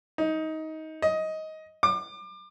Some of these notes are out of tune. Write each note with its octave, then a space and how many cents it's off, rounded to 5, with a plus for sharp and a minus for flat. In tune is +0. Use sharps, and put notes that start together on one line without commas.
D#4 +20
D#5 +15
D6 +30